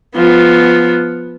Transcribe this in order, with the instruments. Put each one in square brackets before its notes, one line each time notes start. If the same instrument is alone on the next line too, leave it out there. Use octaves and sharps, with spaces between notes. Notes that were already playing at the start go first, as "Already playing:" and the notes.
[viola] F3 B3